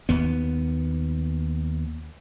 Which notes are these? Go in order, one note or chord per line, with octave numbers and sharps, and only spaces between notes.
D#2 B3